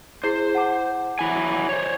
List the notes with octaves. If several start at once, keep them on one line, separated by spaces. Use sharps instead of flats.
E4 G#4 C5 C7
F#5 A5 D6
F#3 E4 G#5
C5 C#5